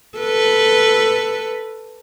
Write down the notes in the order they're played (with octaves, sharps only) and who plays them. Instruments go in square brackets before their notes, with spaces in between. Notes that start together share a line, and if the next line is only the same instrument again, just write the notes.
[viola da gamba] A4 B4